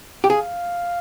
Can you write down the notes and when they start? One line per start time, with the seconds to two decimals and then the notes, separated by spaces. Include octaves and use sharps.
0.24 G4
0.30 G#4 F5